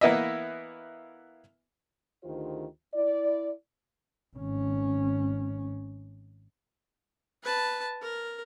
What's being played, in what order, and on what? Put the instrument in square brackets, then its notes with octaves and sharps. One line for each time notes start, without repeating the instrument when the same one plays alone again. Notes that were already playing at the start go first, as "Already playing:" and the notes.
[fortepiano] E3 A#3 B3 E4 D#5 E5
[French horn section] D2 D#3 F4 G4 C5
E4 D5
[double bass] G#1 C#4
[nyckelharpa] B4 A5
A#4